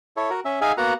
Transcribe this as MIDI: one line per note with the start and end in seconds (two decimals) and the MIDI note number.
0.17 0.30 64
0.17 0.30 69
0.17 0.30 73
0.30 0.40 66
0.30 0.40 70
0.45 0.59 61
0.45 0.59 76
0.61 0.72 63
0.61 0.72 68
0.61 0.72 76
0.61 0.72 77
0.61 0.72 80
0.77 0.93 58
0.77 0.93 59
0.77 0.93 66
0.77 0.93 78
0.77 0.93 82